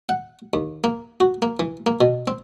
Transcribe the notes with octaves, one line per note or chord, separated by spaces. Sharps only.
F#5
D#2
A#3
F#4
A#3
E3
A#3
B2
C4